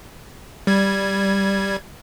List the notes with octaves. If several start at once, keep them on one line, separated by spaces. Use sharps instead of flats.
G3 G#6